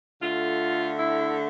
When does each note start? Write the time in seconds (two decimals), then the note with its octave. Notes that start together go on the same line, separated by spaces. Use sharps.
0.21 D3 A3 F4
0.97 E4